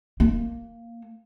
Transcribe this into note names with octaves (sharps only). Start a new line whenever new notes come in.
A#3